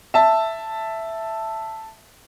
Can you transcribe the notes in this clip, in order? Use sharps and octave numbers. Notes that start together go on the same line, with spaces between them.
E5 A5